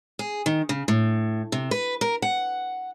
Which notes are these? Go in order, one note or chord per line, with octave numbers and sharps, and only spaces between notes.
G#4
D#3
C#3
A2
C3
B4
A#4
F#5